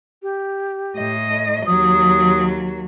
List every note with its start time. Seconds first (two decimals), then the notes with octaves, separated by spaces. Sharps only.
0.22 G4
0.97 A2 D#5
1.66 D#2 F#3 D#6